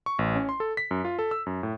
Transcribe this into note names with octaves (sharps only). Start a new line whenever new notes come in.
C#6
A1
C#4
C6
A4
B6
F#2
F4
A4
E6
F#2
A2